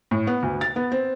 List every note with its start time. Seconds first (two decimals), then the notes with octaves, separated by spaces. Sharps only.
0.11 A2
0.27 B3
0.43 D2
0.61 A6
0.76 B3
0.92 C4